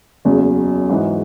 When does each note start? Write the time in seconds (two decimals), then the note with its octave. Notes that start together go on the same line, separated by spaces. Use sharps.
0.25 F#1 E2 C#3 F#3
0.89 G#2 E3 B3 D#4 F#4